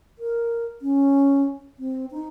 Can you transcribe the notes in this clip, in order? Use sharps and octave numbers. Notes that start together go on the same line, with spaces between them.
A#4
C#4
C4
D#4